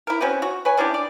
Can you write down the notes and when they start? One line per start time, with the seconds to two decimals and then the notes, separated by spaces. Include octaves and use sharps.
0.07 E4 A#4
0.21 C4 C#4 F#4 B4
0.42 F#4
0.65 B4 C#5 G#5
0.77 C#4 D4 E4 G4
0.94 D5